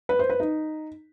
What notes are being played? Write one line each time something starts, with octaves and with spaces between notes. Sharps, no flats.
B4
C5
B4
D#4